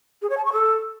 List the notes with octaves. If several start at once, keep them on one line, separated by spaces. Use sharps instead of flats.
G#4
C#5
A5
C#6
A4